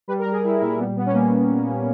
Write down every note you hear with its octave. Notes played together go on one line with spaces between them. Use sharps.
G3 B4
A#4
G3
G#4
G3 E4
A#2 E4
G3 B3
G3 B3
C#4
G3 A#3